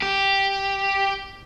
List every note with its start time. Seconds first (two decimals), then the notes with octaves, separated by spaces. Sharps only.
0.03 G4